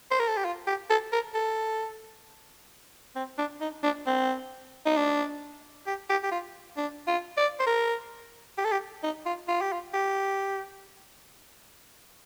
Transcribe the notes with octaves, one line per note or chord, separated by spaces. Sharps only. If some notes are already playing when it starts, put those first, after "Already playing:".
C5
A#4
A4
G4
F4
G4
A4
A#4
A4
C4
D4
D#4
D4
C4
D#4
D4
G4
G4
G4
F4
D4
F4
D5
C5
A#4
G4
A4
G4
D#4
F4
F4
G4
F4
G4